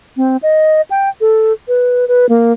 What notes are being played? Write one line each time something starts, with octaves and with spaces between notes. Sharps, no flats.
C4
D#5
G5
A4
B4
B4
A#3